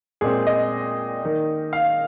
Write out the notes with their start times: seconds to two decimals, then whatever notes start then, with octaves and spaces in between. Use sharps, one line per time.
0.21 A#2 G#3 C4 G#4
0.47 D#5
1.22 D#3 A#3
1.73 F5